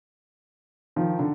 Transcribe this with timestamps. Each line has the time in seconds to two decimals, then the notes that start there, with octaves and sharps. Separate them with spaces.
0.96 D#3 F3
1.19 D3